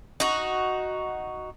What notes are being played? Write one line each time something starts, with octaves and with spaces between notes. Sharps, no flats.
D#4 F#4